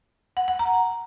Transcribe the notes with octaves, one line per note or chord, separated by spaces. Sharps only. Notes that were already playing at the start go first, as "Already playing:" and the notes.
F#5
F#5
A#5